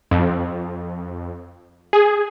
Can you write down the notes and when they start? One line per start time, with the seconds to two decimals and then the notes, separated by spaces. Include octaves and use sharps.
0.11 F2
1.93 G#4